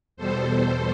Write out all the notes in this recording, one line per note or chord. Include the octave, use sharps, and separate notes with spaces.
E2 B2 G3 A4 C5